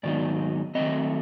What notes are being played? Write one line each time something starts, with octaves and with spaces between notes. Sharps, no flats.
G#2 D#3 F#3 B3 D#4 D5
D#3 F#3 A3 C4 D#5